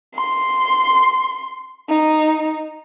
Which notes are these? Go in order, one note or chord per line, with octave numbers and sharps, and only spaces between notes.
C6
D#4